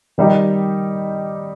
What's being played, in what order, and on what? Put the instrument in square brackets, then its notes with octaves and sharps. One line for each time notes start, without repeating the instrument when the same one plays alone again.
[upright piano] D#3 G3 D#4 G4